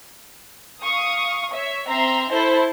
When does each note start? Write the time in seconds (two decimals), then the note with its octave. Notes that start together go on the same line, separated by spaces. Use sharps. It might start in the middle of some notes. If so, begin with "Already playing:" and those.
0.81 F5 C#6 D#6
1.52 C#5 E5
1.87 C4 E5 A#5 C6
2.30 E4 A4 C5 A5